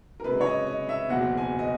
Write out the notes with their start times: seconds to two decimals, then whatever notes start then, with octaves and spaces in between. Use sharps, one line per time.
0.20 A#4
0.24 F#2 C#3 G#3 B4
0.41 C#5
0.46 D#5
0.67 D#5
0.89 E5
1.09 F#1 E2 B2 F#3 F#5
1.37 G#5
1.59 D#5